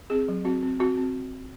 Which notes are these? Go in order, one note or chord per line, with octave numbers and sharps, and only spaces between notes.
C4 G#4
F#3
C4 F#4
C4
C4 F#4
C4